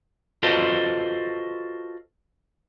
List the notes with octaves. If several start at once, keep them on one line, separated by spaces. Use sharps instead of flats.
F4 F#4 A4 B4 C5 D#5